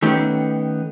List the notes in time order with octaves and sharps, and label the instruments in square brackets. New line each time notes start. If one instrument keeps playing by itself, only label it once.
[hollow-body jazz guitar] D#3 A3 B3 C#4 G4